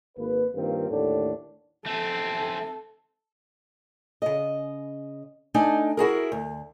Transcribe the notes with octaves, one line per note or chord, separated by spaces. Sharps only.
G#1 A#3 B4
G2 D#3 A#3 C4 F4
D#2 A2 D3 A3 D4
A3 C4 A4
C#3 D#5
A3 D4 D#4 G#5
E4 F#4 G#4 A#4
D2